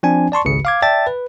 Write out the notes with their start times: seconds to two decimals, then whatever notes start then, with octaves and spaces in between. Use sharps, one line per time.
0.03 F3 C4 D4 G#5
0.32 D5 A5 C6 C#6
0.45 G#1 C#2 C#3 C#7
0.65 F5 D6 G#6
0.82 D5 E5 G5 A5 A6
1.07 B4